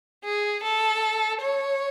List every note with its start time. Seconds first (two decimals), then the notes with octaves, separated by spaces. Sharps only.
0.24 G#4
0.63 A4
1.41 C#5